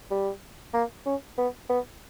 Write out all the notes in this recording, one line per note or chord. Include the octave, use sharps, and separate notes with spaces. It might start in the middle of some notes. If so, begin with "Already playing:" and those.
G3
A#3
C#4
B3
B3